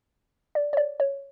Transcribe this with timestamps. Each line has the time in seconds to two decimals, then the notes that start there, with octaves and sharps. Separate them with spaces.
0.55 D5
0.73 C#5
0.77 D5
1.00 C#5